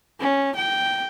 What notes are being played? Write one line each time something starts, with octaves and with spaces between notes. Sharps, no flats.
C#4
G5